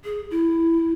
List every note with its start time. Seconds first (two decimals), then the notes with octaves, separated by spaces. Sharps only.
0.05 G#4
0.31 E4